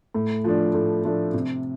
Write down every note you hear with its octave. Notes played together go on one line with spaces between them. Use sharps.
A2
F3 A3 D4
A2
F3 A3 D4
C3